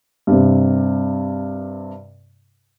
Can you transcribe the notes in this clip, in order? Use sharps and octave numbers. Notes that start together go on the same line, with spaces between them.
G2 C3